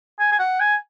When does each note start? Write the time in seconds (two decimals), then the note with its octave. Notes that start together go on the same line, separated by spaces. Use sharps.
0.19 G#5
0.32 G#5
0.39 F#5
0.60 G#5